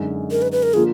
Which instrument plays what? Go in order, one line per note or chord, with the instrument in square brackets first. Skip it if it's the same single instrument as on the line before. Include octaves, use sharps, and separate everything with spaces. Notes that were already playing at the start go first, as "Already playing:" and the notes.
Already playing: [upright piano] F#2 D3 G#3 D#4
[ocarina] A#4
B4
B4
A#4
[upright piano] D3 F3 A#3 F4 [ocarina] G#4